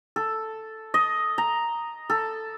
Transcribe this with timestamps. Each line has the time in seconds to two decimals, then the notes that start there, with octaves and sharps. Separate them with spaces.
0.16 A4
0.94 D#5
1.38 A#5
2.10 A4